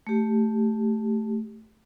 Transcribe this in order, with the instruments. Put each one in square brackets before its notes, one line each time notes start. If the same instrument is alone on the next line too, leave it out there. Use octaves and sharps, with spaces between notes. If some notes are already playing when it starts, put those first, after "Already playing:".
[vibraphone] A3 G4